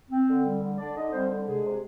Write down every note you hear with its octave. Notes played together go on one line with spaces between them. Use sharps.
C4
D3
G3
D3
D3 D4 D5
D3 D#4 D#5
G3 C4 C5
D3
C3 G#3 G#4
C3